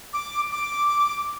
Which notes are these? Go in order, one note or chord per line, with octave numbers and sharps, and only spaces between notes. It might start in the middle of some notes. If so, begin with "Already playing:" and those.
D6
D6